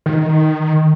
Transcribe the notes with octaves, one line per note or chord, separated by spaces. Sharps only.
D#3